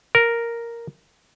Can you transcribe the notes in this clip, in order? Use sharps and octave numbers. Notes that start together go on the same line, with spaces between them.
A#4